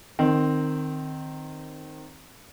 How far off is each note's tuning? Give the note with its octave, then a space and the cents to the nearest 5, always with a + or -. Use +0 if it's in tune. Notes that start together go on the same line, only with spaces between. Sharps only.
D#3 -15 C4 +0